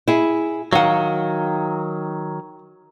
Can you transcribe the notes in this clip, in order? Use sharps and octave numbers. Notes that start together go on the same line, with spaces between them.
E4 G#4
D#3 F#3 F5 F#5